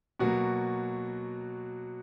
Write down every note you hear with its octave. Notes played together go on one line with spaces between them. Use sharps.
B2 F#3 A#3 F#4